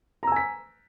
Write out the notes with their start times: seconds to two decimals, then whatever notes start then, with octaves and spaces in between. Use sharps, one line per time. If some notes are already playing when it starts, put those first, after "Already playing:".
0.23 A#5
0.27 E6
0.32 G#5
0.36 B6